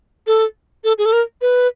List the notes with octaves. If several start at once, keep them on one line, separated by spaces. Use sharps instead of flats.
A4
A4
G#4
A4
A#4
B4